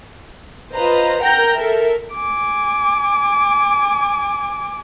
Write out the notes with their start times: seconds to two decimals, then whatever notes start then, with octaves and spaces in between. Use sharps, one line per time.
0.73 F4 B4 C5 D#5 A#5
1.22 A#4 F#5 G5 A#5 G6 A#6
1.55 A4 A#4 E5
2.14 G#5 D6